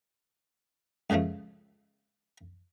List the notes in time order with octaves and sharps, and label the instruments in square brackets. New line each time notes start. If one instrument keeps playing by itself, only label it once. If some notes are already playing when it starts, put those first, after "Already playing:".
[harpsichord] C#2 A#2 C#3 F3 A3